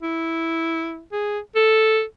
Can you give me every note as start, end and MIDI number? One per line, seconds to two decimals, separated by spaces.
0.02 1.02 64
1.12 1.39 68
1.56 2.02 69